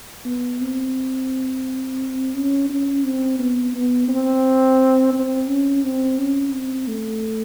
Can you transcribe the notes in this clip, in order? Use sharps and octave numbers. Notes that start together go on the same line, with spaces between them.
B3
C4
C#4
C#4
C4
B3
B3
C4
C4
C#4
C4
C#4
C4
A3